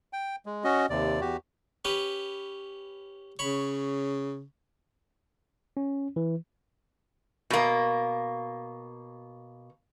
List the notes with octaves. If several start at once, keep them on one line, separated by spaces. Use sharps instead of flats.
G5
G#3
C#4 F#4 D#5
D#2 C3 D5
E2 F#4 G4
C#4 G4 B4
C#3 C#5 B5
C#4
E3
B2 A#3